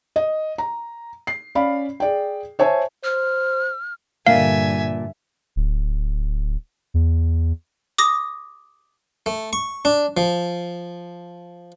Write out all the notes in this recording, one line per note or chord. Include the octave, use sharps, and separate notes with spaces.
D#5
A#5
C7
C#4 D5 F5 B5
G#4 D5 G5
C5 C#5 E5 G#5 A5
C5 F6
G2 A#2 D3 G3 D4 E5 F5 G#5
D1
E2
D6 D#6 A#6
A3
C#6
D4
F3